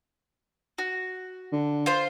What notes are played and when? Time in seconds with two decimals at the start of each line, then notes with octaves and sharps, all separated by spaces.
0.78 F#4
1.52 D3
1.86 F4 C5